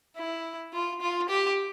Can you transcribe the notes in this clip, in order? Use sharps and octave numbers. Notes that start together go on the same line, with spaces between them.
E4
F4
F4
G4